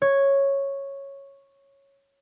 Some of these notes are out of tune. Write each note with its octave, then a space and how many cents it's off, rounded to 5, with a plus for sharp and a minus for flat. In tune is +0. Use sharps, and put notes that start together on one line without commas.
C#5 -5